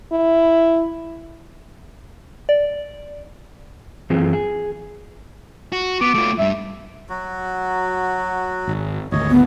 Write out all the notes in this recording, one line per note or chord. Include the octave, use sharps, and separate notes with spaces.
E4
D5
F#2 E3 C4 F4 G#4
G#4
F#4
B3 D6
A3 F4
G2 G3 E5
F#3 F#4
G#1
G#1 D2 C#5 D#5
B3